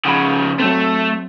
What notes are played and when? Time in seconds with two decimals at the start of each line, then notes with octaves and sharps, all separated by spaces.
0.06 C#3 F3 F#5 B5
0.59 F#3 A3 C4